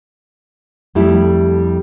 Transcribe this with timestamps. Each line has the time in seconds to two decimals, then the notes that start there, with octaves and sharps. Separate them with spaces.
0.95 F2 G3 A3 E4